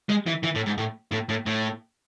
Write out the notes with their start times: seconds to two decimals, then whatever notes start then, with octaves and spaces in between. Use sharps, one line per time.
0.09 G#3
0.26 E3
0.43 E3
0.55 A2
0.66 G#2
0.78 A2
1.12 A2
1.29 A2
1.46 A2